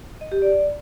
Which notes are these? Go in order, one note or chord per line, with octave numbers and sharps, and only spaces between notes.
D#5
G4
D5